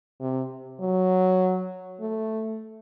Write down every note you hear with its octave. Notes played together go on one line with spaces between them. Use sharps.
C3
F#3
A3